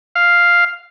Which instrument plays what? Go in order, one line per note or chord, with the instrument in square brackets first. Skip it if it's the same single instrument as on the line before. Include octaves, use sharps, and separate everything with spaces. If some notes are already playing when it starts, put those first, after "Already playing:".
[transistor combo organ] F5